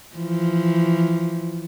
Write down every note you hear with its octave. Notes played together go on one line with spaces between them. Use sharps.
E3 F3